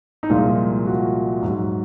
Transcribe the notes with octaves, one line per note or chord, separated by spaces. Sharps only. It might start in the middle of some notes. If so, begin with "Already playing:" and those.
D#4
C2 A#2 F3 G#3 F4
F#4
G#2 F#3